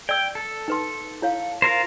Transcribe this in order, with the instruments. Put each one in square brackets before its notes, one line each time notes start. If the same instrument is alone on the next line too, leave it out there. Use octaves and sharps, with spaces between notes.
[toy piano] D5 E6 [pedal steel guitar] G5
[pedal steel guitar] A4
[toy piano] D#4 B4 C6
E4 C#5 F5
[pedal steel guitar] F4 A#4 C5